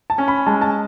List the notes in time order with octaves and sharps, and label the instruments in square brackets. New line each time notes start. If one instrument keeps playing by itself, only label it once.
[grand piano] A5
[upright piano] C#4
[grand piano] B5
[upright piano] G#3 [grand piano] A5
[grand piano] A5